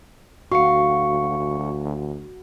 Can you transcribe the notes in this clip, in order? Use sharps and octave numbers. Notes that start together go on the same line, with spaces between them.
D2 F#4 F5 C#6 C#7